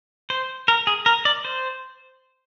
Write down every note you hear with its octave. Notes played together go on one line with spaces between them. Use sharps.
C5
A#4
G#4
A#4
D5
C5